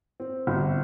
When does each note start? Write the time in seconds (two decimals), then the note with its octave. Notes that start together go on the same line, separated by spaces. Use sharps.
0.20 C4
0.47 G1